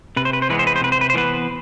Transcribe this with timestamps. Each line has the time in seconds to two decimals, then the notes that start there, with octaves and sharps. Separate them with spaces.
0.16 C3 B4
0.25 C5
0.33 B4
0.42 C5
0.49 E3 G#3 B3 B4
0.59 C5
0.67 B4
0.76 C5
0.81 C3 B4
0.92 C5
1.01 B4
1.10 C5
1.14 E3 G#3 B3 B4